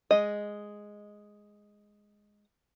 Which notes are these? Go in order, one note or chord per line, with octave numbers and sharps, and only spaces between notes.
G#3 D#5